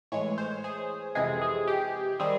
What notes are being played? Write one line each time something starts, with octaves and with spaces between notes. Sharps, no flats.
A2 E3 G#3 C#5
C5
G#4
F2 C3 E3 G#3 G#4
G#4
G4
D#3 G3 C4 G#4